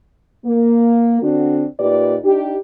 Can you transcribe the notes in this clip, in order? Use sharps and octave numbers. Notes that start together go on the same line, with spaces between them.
A#3
D3 C4 D4 F#4
A#2 D#4 G4 B4 D5
D4 D#4 G4